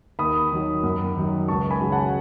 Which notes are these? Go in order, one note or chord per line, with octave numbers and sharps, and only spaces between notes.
D#2 B5 D#6
D#3 F#3
F#2
D#3 F#3
C#2 A5 C#6
G#5 B5
C#3 F#3
F#5 A5